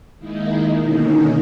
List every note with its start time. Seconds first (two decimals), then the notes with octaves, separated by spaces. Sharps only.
0.19 D#3 G#3 A#3 D#4 E4
0.79 B2 D3 D#3 A#3 C#4 D#4